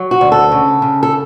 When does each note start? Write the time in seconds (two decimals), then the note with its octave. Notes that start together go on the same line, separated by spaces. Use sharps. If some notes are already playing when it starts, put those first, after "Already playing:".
Already playing: F#3
0.11 F#4
0.21 D2
0.32 A4
0.52 C#3
0.82 C#3
1.03 A4